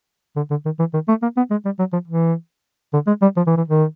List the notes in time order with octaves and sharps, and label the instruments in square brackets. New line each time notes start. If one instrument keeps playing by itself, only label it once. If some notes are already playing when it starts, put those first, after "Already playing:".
[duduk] D3
D3
D#3
E3
D#3
A3
A#3
B3
G#3
G3
F#3
F3
E3
D3
G#3
G3
F3
E3
E3
D#3